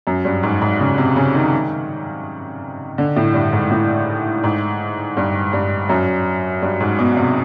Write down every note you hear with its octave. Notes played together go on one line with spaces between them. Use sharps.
F#2
G2
G#2
G#2
C#3
C3
C#3
D#3
D3
A2
G2
G#2
A2
G#2
G2
G2
F#2
G2
G#2
B2
C3